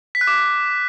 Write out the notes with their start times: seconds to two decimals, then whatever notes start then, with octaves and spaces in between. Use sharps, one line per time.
0.15 B6
0.21 F#6
0.27 D6